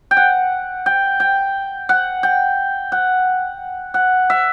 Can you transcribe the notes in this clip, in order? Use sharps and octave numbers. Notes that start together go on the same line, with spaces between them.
G5
F#5
G5
G5
F#5
G5
F#5
F#5
E5